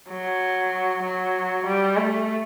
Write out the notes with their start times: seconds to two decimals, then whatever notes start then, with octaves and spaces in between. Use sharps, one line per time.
0.11 F#3
1.04 F#3
1.66 G3
1.97 A3